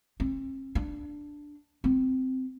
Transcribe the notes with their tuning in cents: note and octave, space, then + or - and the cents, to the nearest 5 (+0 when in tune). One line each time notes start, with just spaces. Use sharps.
C4 +45
D4 +0
C4 -10